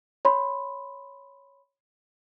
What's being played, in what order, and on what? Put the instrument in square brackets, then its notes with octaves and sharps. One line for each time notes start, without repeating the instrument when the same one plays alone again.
[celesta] C#5 B5 C6